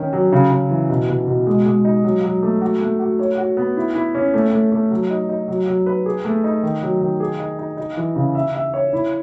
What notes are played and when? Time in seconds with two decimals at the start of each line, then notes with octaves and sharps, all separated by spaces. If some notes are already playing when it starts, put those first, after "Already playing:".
Already playing: D#3 C#4
0.13 F#3
0.32 C#3
0.51 C#3
0.70 E3
0.90 B2
1.08 B2
1.28 B2
1.47 G#3
1.66 G#3
1.85 D#4
2.04 F#3
2.24 F#3
2.43 A3
2.61 F#4
2.81 A3
3.00 F#4
3.19 C#5
3.38 F#4
3.57 B3
3.77 E4
3.95 E4
4.15 C#4
4.34 A3
4.53 A3
4.72 A3
4.91 F#3
5.10 D#4
5.29 D#4
5.48 F#3
5.67 F#3
5.86 B4
6.06 G#4
6.25 A3
6.44 D#4
6.63 D#3
6.82 F#3
7.01 D#3
7.20 G#4
7.40 D#4
7.59 D#4
7.77 D#4
7.97 E3
8.16 C#3
8.35 E5
8.55 E5
8.74 C#5
8.93 E4